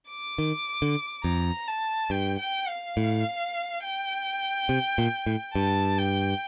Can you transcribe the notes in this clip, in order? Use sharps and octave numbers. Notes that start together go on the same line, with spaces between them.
D6
D#3
D3
F2 A#5
A5
G2 G5
G5
F5
A2
G5
C3
A#2
A2
G2 A5
G5